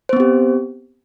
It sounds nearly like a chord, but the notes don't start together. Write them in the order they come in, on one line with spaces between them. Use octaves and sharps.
C5 B3 C4 G4